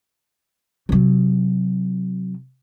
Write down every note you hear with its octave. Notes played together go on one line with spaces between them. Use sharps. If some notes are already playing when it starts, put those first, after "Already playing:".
C3 F#3